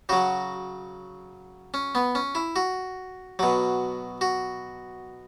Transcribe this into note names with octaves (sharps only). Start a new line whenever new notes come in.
C#3 F#3 F#4
C#4
B3
C#4
E4
F#4
B2 F#3
F#4